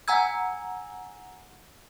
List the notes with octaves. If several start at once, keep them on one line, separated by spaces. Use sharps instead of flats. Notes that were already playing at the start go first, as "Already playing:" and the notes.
F#5 G#5 A#5 E6 G#6